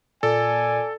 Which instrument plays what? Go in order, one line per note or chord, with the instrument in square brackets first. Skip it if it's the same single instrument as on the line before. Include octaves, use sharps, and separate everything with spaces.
[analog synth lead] A#2 [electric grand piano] A4 [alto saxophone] D5 [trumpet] G#5